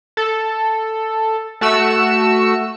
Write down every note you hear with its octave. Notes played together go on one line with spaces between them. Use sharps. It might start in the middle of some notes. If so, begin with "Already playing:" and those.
A4
A3 F#4 E6 C#7